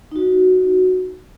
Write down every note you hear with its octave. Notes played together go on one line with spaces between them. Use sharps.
D#4 F#4